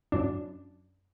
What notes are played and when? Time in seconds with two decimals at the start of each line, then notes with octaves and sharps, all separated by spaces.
0.12 F#2 D4